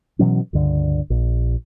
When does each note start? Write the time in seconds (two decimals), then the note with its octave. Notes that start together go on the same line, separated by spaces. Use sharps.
0.19 B2 E3 F#3 C#4
0.53 C#2 G2 D3
1.10 A#1